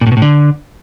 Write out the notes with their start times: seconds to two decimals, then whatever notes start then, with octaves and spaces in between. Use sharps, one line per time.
0.01 A#2
0.07 A2
0.12 B2
0.17 A2
0.22 D3